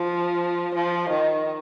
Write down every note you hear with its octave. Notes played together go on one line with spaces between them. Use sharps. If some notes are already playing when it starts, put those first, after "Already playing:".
Already playing: F3
F3
D#3